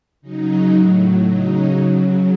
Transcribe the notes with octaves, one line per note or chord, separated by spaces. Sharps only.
C#3 F#3 D#4
A2 F#3
C#3 F#3 D#4
C#3 F#3